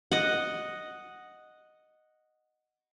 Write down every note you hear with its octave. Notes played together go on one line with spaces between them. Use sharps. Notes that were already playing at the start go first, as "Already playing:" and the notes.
D#5 F#5